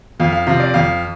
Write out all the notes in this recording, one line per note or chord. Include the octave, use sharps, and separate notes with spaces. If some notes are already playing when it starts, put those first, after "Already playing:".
F2 F5
F5
C3 F3 F5
D5
F2 F5